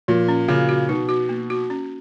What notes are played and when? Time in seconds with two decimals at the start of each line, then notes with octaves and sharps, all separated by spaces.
0.08 A#2 F3
0.28 C#4
0.48 A#2 C#3 F#4
0.69 F#4
0.89 B2 D#4
1.09 F#4
1.29 A#3
1.50 F#4
1.70 C#4